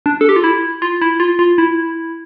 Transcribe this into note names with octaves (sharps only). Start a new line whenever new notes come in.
D4
A4
G4
F4
E4
F4
E4
F4
F4
E4